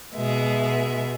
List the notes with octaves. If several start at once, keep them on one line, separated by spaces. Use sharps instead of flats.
B2 G#3 E5